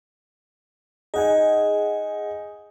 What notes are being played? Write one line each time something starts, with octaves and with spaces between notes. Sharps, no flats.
D#4 G#4 F#5 G#5